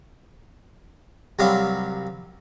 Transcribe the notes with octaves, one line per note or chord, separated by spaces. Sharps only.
C2 F#3 G3 C4 F5 B5